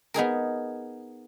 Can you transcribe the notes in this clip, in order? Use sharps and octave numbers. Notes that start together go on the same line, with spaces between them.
B3 D#4 G#4 A#4